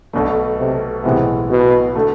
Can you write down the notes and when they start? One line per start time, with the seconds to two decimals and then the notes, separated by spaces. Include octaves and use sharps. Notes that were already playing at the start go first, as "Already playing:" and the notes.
0.13 B1 B2 D3 A3
0.59 C3
1.04 B1 A2 C3 E3 G#3 B3
1.50 B2
1.95 D3 A3